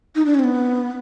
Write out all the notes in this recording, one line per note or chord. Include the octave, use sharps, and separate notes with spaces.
D#4
D4
C#4
C4
B3